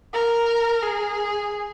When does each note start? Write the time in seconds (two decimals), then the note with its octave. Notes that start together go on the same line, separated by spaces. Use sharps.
0.13 A#4
0.82 G#4